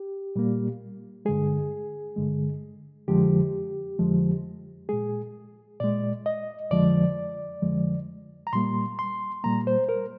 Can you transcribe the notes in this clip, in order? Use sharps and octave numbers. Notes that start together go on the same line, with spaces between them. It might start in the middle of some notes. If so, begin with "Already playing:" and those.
Already playing: G4
A#2 G3 A#3
G2 D3 G#3 G#4
G2 D3 G#3
F2 D3 F3 G#3 G4
F2 D3 F3 G#3
A#2 G#3 G#4
A#2 G#3 D5
D#5
F2 D3 F3 G#3 D5
F2 D3 F3 G#3
A#5
A#2 G3 A#3 C6
C6
A#2 G3 A#3 A#5
C5
A#4